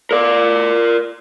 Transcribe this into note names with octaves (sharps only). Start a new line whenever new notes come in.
A#4 D5